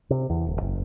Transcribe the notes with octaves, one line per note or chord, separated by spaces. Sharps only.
C3
E2
D1
F#1